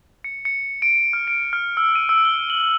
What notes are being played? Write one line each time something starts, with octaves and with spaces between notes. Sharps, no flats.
C#7
C#7
D7
F6
D7
F6
E6
D#7
E6
G7
F#7